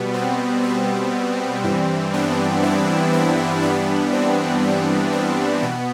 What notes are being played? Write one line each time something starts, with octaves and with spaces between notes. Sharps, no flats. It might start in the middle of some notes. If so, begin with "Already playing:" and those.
Already playing: B2 G3 B3
C4
C4
G2 E3 G3
B3 D4
C4 E4
C4 E4
G2 E3 G3 B3 D4
C4
B3
C4
B2 B3